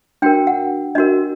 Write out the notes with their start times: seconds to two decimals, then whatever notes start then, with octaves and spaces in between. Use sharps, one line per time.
0.22 D4 F#4 A#4 G5
0.47 F#5
0.95 D4 F#4 A#4 D#5